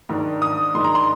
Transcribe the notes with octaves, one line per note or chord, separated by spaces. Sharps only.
G#2 D#3 G#3 D4
D#6
G#2 D#3 G#3 D4 C6
A#5
C6